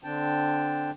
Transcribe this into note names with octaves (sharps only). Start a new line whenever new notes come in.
D3 C4 D4 G5 A5